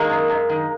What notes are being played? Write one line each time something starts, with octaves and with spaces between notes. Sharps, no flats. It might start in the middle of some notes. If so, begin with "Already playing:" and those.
Already playing: D#3 G#3 A#3
F#2
F#2
D#3